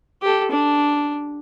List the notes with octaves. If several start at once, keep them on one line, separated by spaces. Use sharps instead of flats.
G4 A4
D4